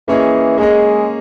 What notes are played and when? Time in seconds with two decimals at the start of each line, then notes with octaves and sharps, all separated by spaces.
0.08 E3 A#3 C#4 G#4 D#5
0.58 G#3 A#3 C#4 G#4 D#5